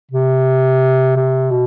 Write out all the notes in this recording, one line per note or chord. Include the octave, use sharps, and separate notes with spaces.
C3
C3
B2